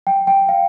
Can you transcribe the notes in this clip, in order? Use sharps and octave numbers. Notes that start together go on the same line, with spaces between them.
G5
G5
F5